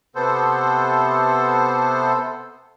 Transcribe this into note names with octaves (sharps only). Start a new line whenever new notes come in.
C3 B3 A4 C5